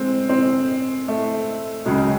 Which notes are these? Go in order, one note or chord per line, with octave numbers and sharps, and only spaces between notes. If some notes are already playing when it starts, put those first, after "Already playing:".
Already playing: G#3 C4
C4
A3
C#2 C#3 F#3 G#3